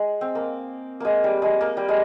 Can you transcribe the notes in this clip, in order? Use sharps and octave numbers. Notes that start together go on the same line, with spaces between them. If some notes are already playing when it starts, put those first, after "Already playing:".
Already playing: G#3
C4
A#3
G#3 A#3
G3
G#3
A#3
G3
G#3